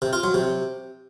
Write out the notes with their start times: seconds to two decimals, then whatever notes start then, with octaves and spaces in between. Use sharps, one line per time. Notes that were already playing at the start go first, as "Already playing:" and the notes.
0.02 C3
0.13 F4
0.24 F#3
0.34 C3